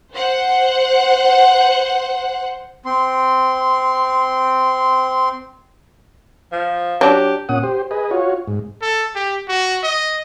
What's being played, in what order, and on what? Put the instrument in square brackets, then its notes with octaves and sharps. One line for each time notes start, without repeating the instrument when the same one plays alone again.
[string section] C5 F#5
[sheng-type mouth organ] C4 C6
[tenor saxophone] F3
[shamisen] F#3 D4 [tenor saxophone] G4
[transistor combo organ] A#2 C#4 F#5 D#6
G4 C5
G#4 B4 D#5
F4 F#4 C#5
G#2
[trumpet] A4
G4
F#4
D#5